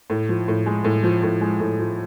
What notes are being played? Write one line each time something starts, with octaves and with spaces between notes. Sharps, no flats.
A2
F3
A2
G#3
A2
F3
A2
G#3
A2
F3